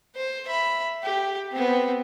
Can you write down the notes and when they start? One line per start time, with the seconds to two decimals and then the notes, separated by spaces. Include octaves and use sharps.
0.16 C5
0.47 E5 B5
1.04 G4
1.52 B3 C4